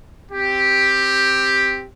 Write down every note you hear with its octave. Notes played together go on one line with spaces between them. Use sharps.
C4 G4